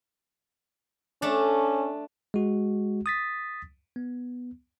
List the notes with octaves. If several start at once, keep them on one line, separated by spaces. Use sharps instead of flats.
A3 C#4 D4
G#3 F#4
D#6 A6 B6
B3